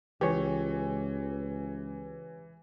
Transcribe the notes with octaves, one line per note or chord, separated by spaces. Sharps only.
C#2 E3 G4 C#5